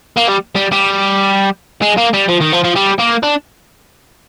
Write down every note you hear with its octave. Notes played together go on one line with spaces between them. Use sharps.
A#3
G3
G3
G3
G#3
A#3
G3
F3
D#3
F3
F3
G3
A#3
D4